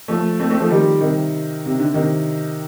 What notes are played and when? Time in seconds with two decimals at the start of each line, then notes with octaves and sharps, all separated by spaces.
0.08 F3 A3
0.39 A3 C4
0.50 A3 C4
0.60 F3 A3
0.70 D#3 G3
1.01 C3 D#3
1.66 C3
1.80 D3
1.94 C3 D#3